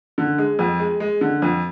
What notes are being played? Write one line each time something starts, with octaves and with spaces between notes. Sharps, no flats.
D3
G#3
F2
G#3
G#3
D3
F2